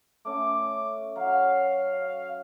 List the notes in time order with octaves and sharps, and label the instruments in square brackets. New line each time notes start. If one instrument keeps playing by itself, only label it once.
[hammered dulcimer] A3 C#4 [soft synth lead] D6
[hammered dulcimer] F#3 [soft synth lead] F5